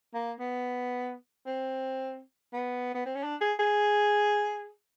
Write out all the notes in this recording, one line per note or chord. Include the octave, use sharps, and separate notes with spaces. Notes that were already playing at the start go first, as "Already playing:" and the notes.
A#3
B3
C4
B3
B3
C4
C#4
D4
G#4
G#4